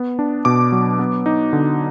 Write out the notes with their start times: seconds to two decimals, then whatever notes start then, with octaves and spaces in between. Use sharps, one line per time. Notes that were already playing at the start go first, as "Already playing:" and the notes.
Already playing: B3
0.19 D4
0.45 B2 D6
0.72 F#3
0.99 B3
1.26 D#4
1.53 D3